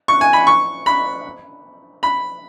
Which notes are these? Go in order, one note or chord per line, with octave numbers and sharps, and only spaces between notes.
C#6
G#5
B5
C#6
B5
B5